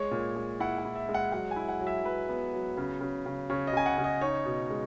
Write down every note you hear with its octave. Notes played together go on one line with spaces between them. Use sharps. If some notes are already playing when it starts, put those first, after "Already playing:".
Already playing: G#3 C#5
A#2
G#3
E4 F#5
F#5
E4
E5
G#3
F#5
F#3 F#5
G#5
E4
F#5
F#3
E5
F#3 B4
B3
F#3
C#3
C#3
C#3
C#3 C#5
D#5
C#3 G#5
F#5
C#3
D#5
D#4 C#5
B2
G#3